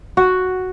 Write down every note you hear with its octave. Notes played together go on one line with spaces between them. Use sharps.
F#4